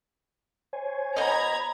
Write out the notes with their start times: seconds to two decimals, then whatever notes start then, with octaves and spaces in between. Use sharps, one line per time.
0.73 C5 C#5 G#5
1.16 B2 D#5 A#5 B5 G#6